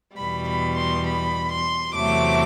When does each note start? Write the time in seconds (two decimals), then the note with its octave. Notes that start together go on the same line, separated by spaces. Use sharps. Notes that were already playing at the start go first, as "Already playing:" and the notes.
0.17 E2 B2 G3 B5
0.47 B5
0.76 C6
1.06 B5
1.50 C6
1.94 E2 C3 F#3 A3 D6